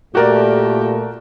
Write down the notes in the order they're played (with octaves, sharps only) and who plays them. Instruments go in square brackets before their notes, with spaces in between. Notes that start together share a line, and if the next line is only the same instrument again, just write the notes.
[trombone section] A#2 A3 [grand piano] F#4 A#4 D5 [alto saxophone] G4